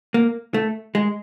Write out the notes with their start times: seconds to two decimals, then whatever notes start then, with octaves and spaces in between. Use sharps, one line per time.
0.14 A#3
0.54 A3
0.95 G#3